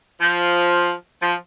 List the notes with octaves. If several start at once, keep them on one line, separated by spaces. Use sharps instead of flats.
F3
F3